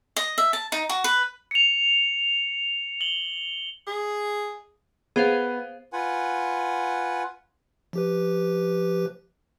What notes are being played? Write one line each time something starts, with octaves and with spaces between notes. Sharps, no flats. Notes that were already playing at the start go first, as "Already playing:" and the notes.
D#5
E5
A5
D#4
F#4
B4
C#7 F7
F#7 G7
G#4
B3 G#4 C5 F5
F4 B4 F#5 G#5
F3 G4 B4